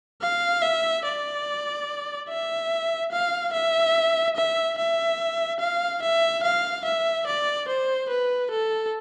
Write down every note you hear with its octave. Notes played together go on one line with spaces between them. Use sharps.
F5
E5
D5
E5
F5
E5
E5
E5
F5
E5
F5
E5
D5
C5
B4
A4